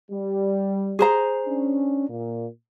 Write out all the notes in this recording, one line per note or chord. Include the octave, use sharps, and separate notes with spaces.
G3
G#4 C5 A#5
C#4 D4
A#2